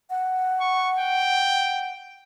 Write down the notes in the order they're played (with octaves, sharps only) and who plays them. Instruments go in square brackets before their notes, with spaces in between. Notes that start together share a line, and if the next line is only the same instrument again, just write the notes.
[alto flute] F#5
[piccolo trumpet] C#6
G5